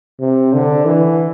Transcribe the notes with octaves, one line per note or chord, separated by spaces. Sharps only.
C3
D3
E3